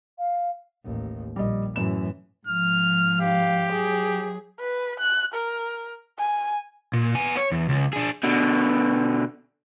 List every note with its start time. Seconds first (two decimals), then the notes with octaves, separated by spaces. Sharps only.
0.18 F5
0.84 A1 D#2
1.36 A#1 G3 D#5
1.76 F#2 A2 E3 E7
2.47 G#2 F3 F6
3.21 G4 F5
3.73 F#3 G#4
4.60 B4
5.00 F#6
5.34 A#4
6.18 G#5
6.93 A#2
7.15 B3 G#5
7.37 C#5
7.52 E2
7.69 C#2
7.93 D4 G#4
8.24 B2 D3